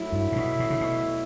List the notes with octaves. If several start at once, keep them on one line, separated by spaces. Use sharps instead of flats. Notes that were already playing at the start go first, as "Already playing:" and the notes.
Already playing: F#3 A3 E4
G2
A2
B2
B2
C#3
B2